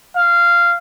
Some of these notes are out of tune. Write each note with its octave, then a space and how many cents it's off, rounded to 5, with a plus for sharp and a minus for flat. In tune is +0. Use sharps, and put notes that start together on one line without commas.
F5 -15